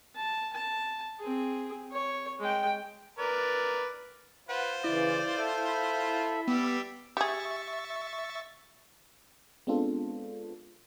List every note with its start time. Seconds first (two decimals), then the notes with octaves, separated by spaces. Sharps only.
0.15 A5
0.52 A5
1.20 C4 G#4
1.92 C#5
2.40 G#3 G5
3.19 A#4 B4 D5
4.49 F4 B4 C5 F#5
4.84 C#3 E3 E4 D5
5.37 A4 E5
5.68 B5
6.48 G3 B3 G4 E5
7.17 G4 G#4 E5 C#6 A6
9.67 G#3 B3 C4 D4 F4 A4